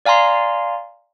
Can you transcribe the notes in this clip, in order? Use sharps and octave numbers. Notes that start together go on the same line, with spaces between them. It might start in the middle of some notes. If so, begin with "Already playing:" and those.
D5 F5 G#5 A#5 C6